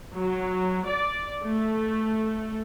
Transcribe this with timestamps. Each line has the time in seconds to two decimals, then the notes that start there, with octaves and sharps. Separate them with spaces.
0.13 F#3
0.87 D5
1.43 A3